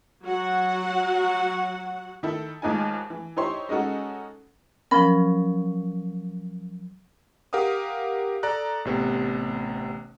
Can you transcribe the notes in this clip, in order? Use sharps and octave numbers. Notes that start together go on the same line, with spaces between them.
F#3 F#4 F#5
D#3 E4 A4
D#2 G#2 D#4 F4 G#5
E3
D#4 E4 G4 C5 C#5 C6
G#3 C#4 D#4 F#4 A4
F3 F#3 C#4 A#4 B5
G4 A#4 F5 F#5 D#6
A4 D5 A#5 F#6
A1 C3 B3